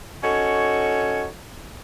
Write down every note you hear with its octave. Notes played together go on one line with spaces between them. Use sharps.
C#4 D#4 F#4 A4 C#5